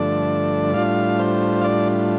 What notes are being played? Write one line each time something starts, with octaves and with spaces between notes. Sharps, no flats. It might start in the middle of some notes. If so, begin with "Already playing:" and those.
Already playing: G2 D3 F3 A3 D4 D5
A2 G3 D4 F4 F5
C5
F5
D5